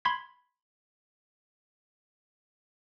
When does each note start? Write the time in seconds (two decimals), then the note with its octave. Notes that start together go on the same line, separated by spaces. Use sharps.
0.05 B5 C6 G#6 B6